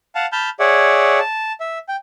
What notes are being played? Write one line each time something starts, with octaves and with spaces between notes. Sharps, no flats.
F5 F#5 A5
A5 B5 F6 G6
G#4 C#5 D5 E5 F#5
A5
E5
G5